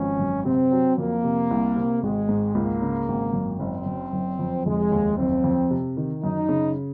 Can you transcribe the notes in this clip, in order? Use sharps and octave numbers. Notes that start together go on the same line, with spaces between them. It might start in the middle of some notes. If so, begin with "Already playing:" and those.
Already playing: G#1 F3 C#4
F#2
C3 C4
F#3
F2 A#3
C3
C2
C3
G#1 G#3
G#2
C#2 A#3
C#3
G#1
F#2
F#1 C4
F#2
F#1
F2
F1 G#3
D#2
F#1 C4
F2
C3
D#3
F#2 D#4
C#3